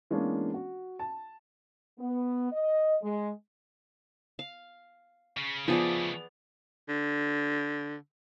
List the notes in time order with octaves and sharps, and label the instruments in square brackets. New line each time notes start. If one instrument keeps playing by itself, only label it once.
[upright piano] E3 G#3 A#3 B3 C#4 D4
F#4
A5
[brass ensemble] B3
D#5
G#3
[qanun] F5
[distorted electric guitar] C#3
[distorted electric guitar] C#3 A3 [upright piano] F3 [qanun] B3 G#4 D5
[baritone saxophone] D3